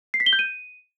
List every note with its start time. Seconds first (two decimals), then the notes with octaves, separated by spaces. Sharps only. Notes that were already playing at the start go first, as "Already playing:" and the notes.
0.14 C7
0.20 B6
0.26 G7
0.33 G6
0.39 D#7